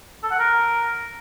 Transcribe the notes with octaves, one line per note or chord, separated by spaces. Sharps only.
A4
F#5
A#4